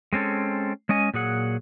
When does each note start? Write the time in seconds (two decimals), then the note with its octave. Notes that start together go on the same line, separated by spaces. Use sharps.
0.13 G#3 C4 C#4 A4
0.89 G#3 C#4 D#5 G#5
1.14 A#2 F#3 G#4 F#5